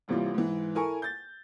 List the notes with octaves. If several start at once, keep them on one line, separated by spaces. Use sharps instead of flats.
D#1 A#1 C3 E3 G3 F4
G#2 E3
E4 A4 A#4 G#5 C#6
G6 A6